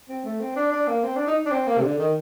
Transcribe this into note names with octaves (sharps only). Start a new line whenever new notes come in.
C4
A3
C4
D4
D4
A#3
C4
D4
D#4
D4
C4
A#3
C3
D3
D#3